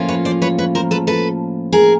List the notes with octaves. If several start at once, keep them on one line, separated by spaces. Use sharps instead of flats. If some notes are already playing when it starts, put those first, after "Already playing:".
Already playing: A2 F3 A#3 C#4 F4
B4 C#5
C5 D5
B4 C#5
B4 C#5
A#4 C5
A4 B4
A4 B4
G#4 A#4